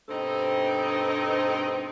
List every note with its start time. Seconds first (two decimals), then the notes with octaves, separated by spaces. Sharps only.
0.09 G2 B2 C4 D#4 A4 C5